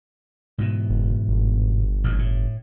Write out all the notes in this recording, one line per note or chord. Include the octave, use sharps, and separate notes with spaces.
G#2 B2 E3
F#1
G1
A1 D#2 G#2
A2